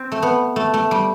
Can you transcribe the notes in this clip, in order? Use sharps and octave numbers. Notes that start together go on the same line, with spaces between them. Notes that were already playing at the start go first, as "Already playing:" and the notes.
Already playing: C4
A3
B3
A3
A3
G3